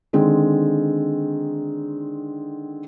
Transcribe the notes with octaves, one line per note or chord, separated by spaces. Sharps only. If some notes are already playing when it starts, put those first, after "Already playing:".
D3 D#3 G#3 C4